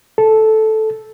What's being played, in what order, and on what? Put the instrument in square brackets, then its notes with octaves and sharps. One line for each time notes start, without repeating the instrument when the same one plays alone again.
[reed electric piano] A4